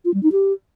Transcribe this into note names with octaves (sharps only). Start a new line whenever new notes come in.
F4
G3
D#4
G4